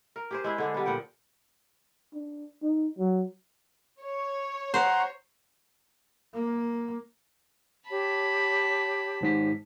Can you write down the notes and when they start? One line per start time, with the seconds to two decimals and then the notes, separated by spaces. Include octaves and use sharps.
0.16 A#4
0.31 G4 G#4 C5
0.44 G#3 E4 G#4
0.58 D3 G#3 D4
0.74 G3 B3
0.86 A#2 F3 F#5 G5
2.14 D4
2.62 D#4
2.98 F#3
4.02 C#5
4.74 C5 F#5 A#5 C6
6.34 A#3
7.89 G4 C#5 A5 B5
9.21 G#1 G#2 B6